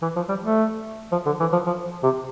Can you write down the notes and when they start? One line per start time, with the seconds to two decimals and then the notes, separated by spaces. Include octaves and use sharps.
0.02 E3
0.16 F3
0.29 G3
0.43 A3
1.12 F3
1.26 D3
1.40 E3
1.53 F3
1.66 F3
2.03 C3